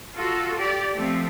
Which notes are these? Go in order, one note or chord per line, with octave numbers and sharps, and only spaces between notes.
F4 F#4 A4
G4 D5
F3 A3 C4